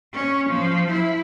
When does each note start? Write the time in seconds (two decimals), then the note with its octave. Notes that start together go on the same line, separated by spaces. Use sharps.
0.14 C#4
0.49 F3
0.90 E4